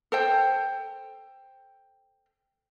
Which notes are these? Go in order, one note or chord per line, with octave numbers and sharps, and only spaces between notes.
A4 C5 G5